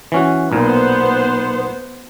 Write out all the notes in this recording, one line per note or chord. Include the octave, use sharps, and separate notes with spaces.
E3 C#4 F#4
B1 A#2 B3 C5